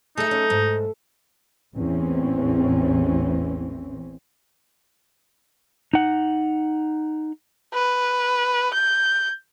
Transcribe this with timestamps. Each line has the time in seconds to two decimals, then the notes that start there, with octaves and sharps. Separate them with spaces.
0.17 A3 D#4 G#4 E5
0.31 C#4
0.50 G#2
1.74 A1 E2 A2 E3 C4 C#4
5.93 D#4 F#5
7.74 B4
8.73 G6